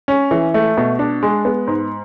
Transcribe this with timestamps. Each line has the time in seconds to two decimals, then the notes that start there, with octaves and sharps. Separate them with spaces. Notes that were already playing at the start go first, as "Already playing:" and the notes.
0.08 C#4
0.31 E3
0.54 A3
0.77 B2
0.99 D4
1.23 G#3
1.45 B3
1.67 G#2